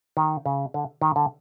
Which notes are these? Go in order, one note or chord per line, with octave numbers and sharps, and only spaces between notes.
D#3
C#3
D3
D#3
D3